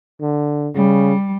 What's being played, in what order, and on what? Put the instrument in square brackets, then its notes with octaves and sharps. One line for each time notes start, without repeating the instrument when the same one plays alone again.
[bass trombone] D3
[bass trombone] C#3 [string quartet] G3